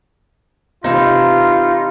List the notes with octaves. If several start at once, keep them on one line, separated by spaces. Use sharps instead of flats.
C3 E3 D#4 F4